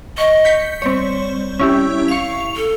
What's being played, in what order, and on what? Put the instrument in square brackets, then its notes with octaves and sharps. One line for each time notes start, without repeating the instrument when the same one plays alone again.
[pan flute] D#5 [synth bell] C#6
[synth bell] G6 B6 C#7
[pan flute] G3 [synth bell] C4 C#5
[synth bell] C#4 E4 G4
[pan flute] F5 [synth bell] C#6 F7
[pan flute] A4